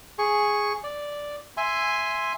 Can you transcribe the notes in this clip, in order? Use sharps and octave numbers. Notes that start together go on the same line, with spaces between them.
G#4 C#6
D5
E5 G#5 C6